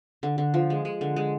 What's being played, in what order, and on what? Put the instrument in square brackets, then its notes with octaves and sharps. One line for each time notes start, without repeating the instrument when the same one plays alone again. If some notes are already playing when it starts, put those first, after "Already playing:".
[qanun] D3
D3
F3
G#3
G#3
D3
G#3